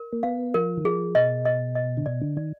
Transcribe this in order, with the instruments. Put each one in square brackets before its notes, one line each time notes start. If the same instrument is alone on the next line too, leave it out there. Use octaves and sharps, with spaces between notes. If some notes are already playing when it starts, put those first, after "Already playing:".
Already playing: [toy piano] A#4
[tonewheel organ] A#3
[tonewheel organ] B3 [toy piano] F5
[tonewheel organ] F3 [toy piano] A#4
[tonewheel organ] D#3
[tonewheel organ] F3 [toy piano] G#4
[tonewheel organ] B2 [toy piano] D#5
[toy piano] D#5
D#5
[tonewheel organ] D3
[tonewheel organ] B2 [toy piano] D5
[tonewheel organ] D3
[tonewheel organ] D#3 [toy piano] D5